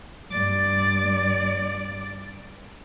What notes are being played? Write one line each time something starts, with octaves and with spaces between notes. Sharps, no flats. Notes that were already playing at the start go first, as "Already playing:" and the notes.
G2 D5